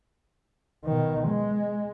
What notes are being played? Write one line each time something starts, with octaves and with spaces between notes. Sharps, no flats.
B2 D#3
G#3